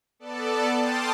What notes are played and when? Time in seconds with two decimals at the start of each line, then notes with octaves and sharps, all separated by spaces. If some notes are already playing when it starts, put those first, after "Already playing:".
0.19 B3 A4 D5 A5
0.77 G5 A5 C6 D6 D#6 F6